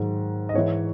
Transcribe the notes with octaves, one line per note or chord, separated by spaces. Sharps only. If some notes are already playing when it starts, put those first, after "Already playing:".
Already playing: G#2 D#3 F#3
D#5
G#2 E3 C#5